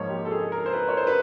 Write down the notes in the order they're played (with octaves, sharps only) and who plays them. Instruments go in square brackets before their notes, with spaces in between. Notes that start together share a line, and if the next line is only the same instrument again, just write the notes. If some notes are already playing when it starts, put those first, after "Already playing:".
Already playing: [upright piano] G#2 F3 A#3 C#5
G4
A4
G#4
A#4
C5
B4
C#5
C5
B4